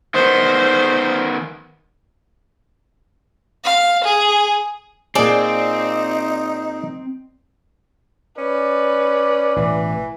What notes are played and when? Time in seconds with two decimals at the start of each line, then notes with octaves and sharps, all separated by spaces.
0.14 D#3 B3 C5
3.65 F5
4.04 G#4
5.15 A#2 C4 D#4 G#4 D5
8.38 C#4 B4 D5
9.56 A1 B2 E3